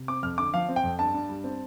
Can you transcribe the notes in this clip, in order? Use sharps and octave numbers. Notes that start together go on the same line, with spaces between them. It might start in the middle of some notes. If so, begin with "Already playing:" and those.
Already playing: C3
C4 D6
F2 F6
D3 D6
F3 F5
C4
G5
F2
G2 A5
G2
G3
C4